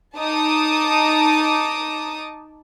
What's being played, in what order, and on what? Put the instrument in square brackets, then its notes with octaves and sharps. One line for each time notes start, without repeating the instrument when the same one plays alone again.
[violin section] D#4 A5 D6 D#6